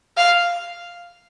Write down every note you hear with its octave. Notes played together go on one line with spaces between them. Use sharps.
F5